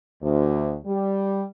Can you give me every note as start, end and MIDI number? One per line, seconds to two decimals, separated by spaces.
0.22 0.75 38
0.85 1.43 55